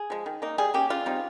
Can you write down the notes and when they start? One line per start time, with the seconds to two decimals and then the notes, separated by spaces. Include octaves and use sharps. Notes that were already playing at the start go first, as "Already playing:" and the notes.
Already playing: G#4
0.10 F3 G#3
0.26 D#3
0.42 A#3 D#4
0.58 G3 G#4
0.74 A#3 C#4 G4
0.90 C#3 F4
1.06 G3 C4 D#4